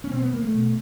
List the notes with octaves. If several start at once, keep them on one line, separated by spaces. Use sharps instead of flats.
C#4
B2 C4
B3
A#3
A3
B2